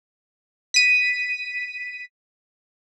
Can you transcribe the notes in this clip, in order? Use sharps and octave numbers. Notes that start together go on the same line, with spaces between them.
B6 D#7